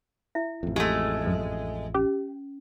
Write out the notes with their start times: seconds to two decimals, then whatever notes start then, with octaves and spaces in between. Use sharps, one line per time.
0.35 E4 E5
0.63 A1 F2
0.76 G#3 A3 G4 C6
1.27 F#2
1.94 C#4 G4